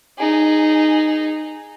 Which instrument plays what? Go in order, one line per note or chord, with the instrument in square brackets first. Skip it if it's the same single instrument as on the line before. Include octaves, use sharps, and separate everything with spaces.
[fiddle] D#4 G#4